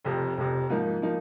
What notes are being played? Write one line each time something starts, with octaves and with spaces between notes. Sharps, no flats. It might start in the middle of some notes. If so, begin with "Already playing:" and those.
F1 F2 C3
F1 F2 C3
G#2 F3 A#3 D#4
F3 A#3 D#4